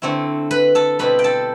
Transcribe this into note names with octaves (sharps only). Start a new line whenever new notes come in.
D3 A3 C4 E4
B4 B5
A4 A5
B2 G3 C4 E4 B4 B5
G5
A4 A5